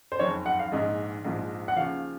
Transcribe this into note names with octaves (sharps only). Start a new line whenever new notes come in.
C5
F#1 F2 D#3 C#5
F#5
F5
A#1 G#2 D#3 D#5
A#1 G#2 F3
F#5
D#2 C#3 F3 F5